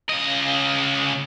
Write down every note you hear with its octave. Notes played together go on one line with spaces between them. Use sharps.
C#2 D#5